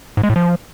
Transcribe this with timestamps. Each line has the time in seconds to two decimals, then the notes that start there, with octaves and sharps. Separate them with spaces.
0.17 G#2
0.23 G#3
0.30 A2
0.36 F3